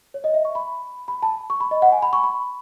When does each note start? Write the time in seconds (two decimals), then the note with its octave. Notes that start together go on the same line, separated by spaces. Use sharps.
0.14 C#5
0.24 D#5
0.34 E5
0.45 C#6
0.55 B5
1.08 B5
1.23 A5
1.50 C#6
1.60 B5
1.71 D#5
1.82 F#5
1.92 G#5
2.02 B5
2.13 C#6
2.24 B5